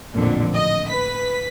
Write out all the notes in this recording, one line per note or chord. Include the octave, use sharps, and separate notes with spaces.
A1 F2 A#2 D3
D#5
B4 B6